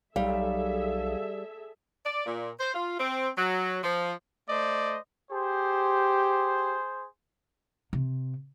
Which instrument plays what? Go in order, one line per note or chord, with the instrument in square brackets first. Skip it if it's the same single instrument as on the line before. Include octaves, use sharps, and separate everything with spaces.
[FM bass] B1 [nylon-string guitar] G3 [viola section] G#4 A4 E5 [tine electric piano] F5
[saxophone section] D5
A#2
C5
F4
C4
F#3
F3
[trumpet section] A3 C5 D5 D#5
[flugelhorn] G4 [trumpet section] G#4 C5
[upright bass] C3